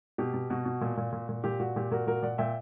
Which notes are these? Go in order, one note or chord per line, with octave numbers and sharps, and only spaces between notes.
B2 G4
B2
B2 F#4
B2
A#2
A#2
A#2
A#2
A#2 G4
A#2 F#4
A#2 G4
A#2 F#4 A#4
A#2 F#4 A#4
A#2 D5 F#5
A#2 E5 G5